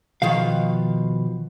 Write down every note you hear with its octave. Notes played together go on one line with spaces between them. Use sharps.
B2 D#3 F3 F5